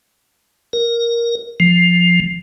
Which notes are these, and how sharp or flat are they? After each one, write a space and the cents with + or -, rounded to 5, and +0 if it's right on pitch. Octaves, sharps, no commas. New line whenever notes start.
A#4 +5
F3 +10